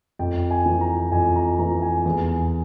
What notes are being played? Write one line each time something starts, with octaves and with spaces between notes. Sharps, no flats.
F2 G5
G#5
E3
A#5
F2 G#5
A#5
E3 A#5
G#5
E2